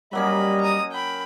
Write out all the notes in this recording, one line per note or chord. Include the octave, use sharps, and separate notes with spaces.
F#3 G3 A#3 C#4 D#5 B5
A#5 D#6
G5 B5